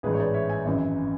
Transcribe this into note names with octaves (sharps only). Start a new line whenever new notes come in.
A1 G#2 E3 G#4 B4
C#5
B4 D5
C#5 E5
E5 G#5
G#1 F#2 E3